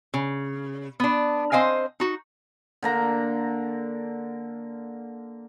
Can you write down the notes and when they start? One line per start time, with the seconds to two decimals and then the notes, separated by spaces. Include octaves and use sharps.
0.14 C#3
1.00 B3 D4
1.52 C4 C5 D#5 F5 G#5
2.00 D#4 F#4
2.83 D3 A#3 A#5